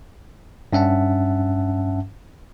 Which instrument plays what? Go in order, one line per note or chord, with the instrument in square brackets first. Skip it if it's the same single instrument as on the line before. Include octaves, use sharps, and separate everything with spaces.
[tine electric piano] G2 C#4 E5 F#5 A5